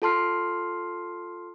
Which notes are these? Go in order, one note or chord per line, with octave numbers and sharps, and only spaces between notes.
F4 A4 A5 C6 F6 C7